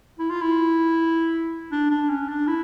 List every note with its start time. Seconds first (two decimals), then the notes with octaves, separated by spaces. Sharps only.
0.19 E4
0.31 F4
0.42 E4
1.72 D4
1.91 D4
2.10 C#4
2.29 D4
2.48 E4